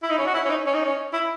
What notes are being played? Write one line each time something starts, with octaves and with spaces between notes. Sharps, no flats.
E4
D#4
C#4
F#4
E4
C#4
D#4
C#4
D#4
C#4
E4